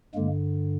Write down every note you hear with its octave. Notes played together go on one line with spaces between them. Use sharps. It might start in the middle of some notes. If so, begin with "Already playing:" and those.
G2 D3 G#3 A#3